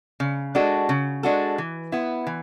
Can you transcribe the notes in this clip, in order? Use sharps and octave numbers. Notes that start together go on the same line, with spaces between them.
C#3
G#3 D4 F#4 A4
C#3
G#3 D4 F#4 A4
E3
B3 E4
E3